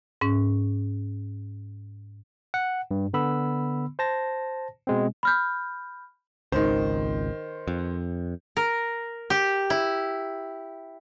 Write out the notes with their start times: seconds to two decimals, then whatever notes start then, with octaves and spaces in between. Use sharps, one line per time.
0.21 G#2 C#4
2.54 F#5
2.91 G2
3.13 D3 B3 B5 E6
3.99 C5 A5 A#6
4.87 B2 G#3 C4
5.23 B5 F6 G6
6.52 G#1 C#2 D#3 C5
7.68 F2
8.57 A#4
9.30 G4
9.70 E4